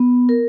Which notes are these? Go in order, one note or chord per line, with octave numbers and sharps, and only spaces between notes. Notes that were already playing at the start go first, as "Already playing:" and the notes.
Already playing: B3
A#4